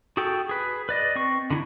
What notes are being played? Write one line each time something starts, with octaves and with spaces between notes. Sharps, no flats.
F#4 G#4 A4 G5
G#4 B4
B4 D5 D#5
C4 C#6
D3 D#4 E4